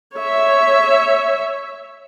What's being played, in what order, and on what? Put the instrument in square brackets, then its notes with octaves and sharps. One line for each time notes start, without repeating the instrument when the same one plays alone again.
[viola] C#5 E5